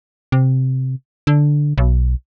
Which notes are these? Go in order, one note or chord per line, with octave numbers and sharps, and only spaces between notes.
C3
D3
B1